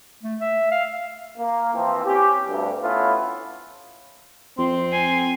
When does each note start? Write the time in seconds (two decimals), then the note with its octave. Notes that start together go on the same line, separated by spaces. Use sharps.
0.23 A3
0.40 E5
0.71 F5
1.38 A#3
1.74 E3 F3 C4
2.05 C4 C#4 G4
2.49 D2 G2
2.81 A3 B3 C#4 E4 F4
4.58 F2 C4 C6
4.92 G#5 C7